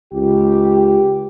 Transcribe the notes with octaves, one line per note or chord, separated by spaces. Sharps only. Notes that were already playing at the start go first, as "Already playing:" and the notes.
C#2 G4